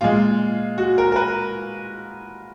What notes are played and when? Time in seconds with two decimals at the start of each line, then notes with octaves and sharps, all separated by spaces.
0.01 A#2 G#3 F4
0.78 F#4
0.98 A#4
1.12 A#4
1.16 B4